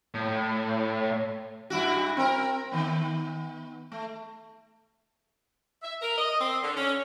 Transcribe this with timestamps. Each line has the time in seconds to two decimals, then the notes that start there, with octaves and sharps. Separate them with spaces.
0.14 A2
1.70 G2 E4 F#4
2.17 C4 A#4
2.72 D#3 B3
3.92 A3
5.83 E5
6.01 A#4
6.18 D#5
6.39 C4
6.62 D3
6.77 C#4